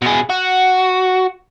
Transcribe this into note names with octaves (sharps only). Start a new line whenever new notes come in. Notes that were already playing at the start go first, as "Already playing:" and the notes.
B2 G#4
F#4